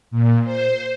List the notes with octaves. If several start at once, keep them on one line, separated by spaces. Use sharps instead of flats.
A#2
C5